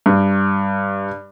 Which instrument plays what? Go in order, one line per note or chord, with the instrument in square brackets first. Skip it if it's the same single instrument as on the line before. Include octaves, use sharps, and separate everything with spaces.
[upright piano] G2